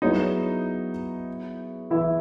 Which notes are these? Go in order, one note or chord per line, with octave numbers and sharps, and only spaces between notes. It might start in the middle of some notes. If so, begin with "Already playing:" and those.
F#3 B3 D#4 E4 G#4 C#5
E3 E4